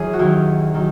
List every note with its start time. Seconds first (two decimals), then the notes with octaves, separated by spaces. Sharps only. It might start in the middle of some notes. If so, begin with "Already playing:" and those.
Already playing: F#2 E3 G#4 C#5
0.13 F#4
0.19 D#2 D#3 F#3 E4
0.74 D#3 F#3